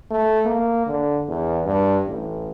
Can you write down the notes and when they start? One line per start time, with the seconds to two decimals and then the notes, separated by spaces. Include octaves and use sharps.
0.11 A3
0.45 A#3
0.87 D3
1.28 E2
1.65 G2
2.07 A1